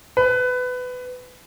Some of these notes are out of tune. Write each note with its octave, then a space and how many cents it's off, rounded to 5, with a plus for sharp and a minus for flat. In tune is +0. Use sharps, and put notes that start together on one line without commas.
B4 +20